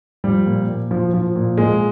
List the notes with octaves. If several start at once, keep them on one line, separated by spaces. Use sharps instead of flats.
F3 G3
A#2
A#2
F3
F3
A#2
A#2 G#3